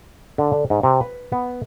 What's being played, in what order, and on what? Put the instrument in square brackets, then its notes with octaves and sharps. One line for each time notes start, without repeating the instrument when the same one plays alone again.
[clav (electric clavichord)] D3
D3
G#2
C3
B4
B3